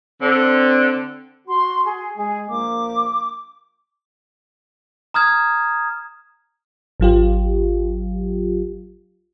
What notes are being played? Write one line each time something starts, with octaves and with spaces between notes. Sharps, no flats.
D3 C4
F#4 C6
G#4
G#3 G#4
A#1 A#3 D6
A#5 D#6 F6 G#6
G#1 F#3 F4 G4